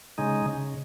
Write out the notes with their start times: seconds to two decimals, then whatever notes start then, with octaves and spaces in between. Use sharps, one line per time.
0.18 C#3 G#3 D#4
0.46 C#3